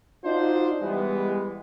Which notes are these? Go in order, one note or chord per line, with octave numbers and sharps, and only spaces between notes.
D4 D#4 F4 F#4 C5
E3 G3 G#3 B3